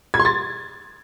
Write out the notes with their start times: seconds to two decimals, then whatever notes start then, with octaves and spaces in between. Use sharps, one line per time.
0.14 G#6
0.19 C6
0.25 A6